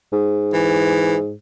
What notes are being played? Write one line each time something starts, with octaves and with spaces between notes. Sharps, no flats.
G#2
E3